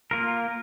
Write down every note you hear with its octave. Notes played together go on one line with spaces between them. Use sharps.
A#3 F4 A#4